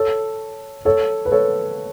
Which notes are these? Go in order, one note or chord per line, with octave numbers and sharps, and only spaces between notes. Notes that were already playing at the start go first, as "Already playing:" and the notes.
Already playing: A4 C#5
A4 C#5
B4
A4 C#5